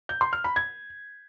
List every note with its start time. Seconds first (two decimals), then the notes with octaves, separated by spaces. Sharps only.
0.09 G6
0.21 C6
0.33 F6
0.44 B5
0.56 G#6